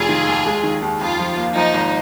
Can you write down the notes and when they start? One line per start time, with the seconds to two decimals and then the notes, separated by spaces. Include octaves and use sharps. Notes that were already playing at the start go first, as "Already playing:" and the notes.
Already playing: F1 F4 G#4
0.09 D#3
0.27 D#2
0.46 G#3
0.63 D#3
0.82 D#2
1.00 F2 F4
1.19 F3
1.37 A#3
1.56 F3 D#4
1.74 G#1